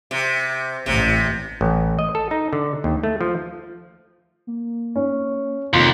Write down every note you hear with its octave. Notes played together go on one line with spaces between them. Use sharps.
C3
A1 C3
A1
D#5
A4
D#4
D3
D#2
A3
F3
A#3
C#4
F1 D#2 F4 C6